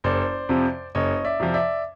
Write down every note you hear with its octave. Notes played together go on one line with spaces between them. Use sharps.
F#1 C5 D5
F2 C3 F3
F#1 C#5 D#5
D5 E5
F2 C3 F3
D5 E5